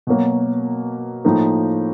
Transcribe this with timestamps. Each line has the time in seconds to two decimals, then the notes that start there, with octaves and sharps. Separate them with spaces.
0.07 B2 F#3 A#3
1.25 A2 F3 A#3 D#4